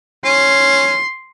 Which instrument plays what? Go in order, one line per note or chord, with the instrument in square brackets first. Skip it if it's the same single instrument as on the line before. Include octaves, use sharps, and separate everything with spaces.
[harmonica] C#4 [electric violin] C6